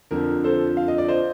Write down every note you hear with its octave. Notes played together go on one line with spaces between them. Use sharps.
F2 D3 F3 A#4
A4 C5
F5
D#5
D5
C5 D#5